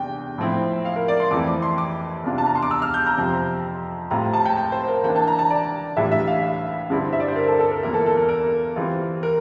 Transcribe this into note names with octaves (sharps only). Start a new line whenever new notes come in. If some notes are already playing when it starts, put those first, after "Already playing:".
Already playing: E2 C3 D4 G5
A2 F3 C4 E4
F5
A#4
D5
C6
F2 E3 A3 C4 E4 D6
D6
C6
D6
E2 C3 G3 D4 F4
A5
A#5
C6
D6
E6
F6
G6
A#5
F2 C3 F3 C4
A2 G3 C4 F4 A#5
A5
G5
G5
C5
A#4
E3 A#3 D4 G5
A5
A#5
A5
D5
A2 E3 G3 D4 F4 E5
E5
F5
E5
G2 D3 G3 C4 E4
E5
D5
C5
A#4
A4
A4
A#4
E2 E3 A#3 F4 A#4
A4
A4
A#4
A#4
E3 G3 C4 F4
A#4